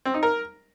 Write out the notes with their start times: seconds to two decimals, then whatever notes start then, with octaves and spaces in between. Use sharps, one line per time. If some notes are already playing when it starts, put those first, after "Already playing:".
0.05 C4
0.14 D#4
0.23 A#4